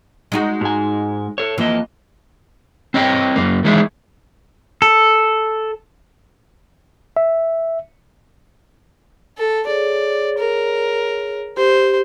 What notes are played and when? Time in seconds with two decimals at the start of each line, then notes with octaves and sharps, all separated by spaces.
0.32 G#3 D#4 F#4
0.61 G#2 G#5
1.38 A4 C#5
1.58 F2 E3 A#3 D#5
2.94 C4 C#5 D#5 G5
3.36 F#2 A#3
3.64 D#3 E3 G#3 D#4 E4
4.82 A4
7.17 E5
9.37 A4
9.67 G#4 C#5 D5
10.38 A#4
11.57 G4 C5